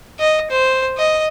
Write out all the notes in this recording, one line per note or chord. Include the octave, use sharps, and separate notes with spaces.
D#5
C5
D#5